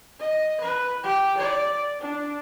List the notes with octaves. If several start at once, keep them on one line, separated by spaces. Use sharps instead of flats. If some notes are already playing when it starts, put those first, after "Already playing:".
D#5
B4
G4
D5
D4